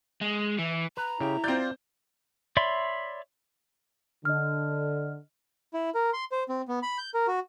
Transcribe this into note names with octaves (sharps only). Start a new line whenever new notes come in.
G#3
E3
B4 A#5
C#3 E4 G4
C4 F4 D5 G6
C#5 D5 E5 B5 C6
D3 D#5 F6
E4
A#4
C6
C5
C4
B3
B5
G6
A#4
F#4